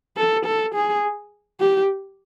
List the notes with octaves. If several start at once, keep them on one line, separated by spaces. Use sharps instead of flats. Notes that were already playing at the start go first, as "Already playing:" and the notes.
A4
A4
G#4
G4